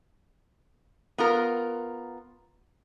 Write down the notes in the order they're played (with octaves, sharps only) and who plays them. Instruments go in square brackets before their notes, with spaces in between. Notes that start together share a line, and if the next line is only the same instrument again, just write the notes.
[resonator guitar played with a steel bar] B3 F4 A#4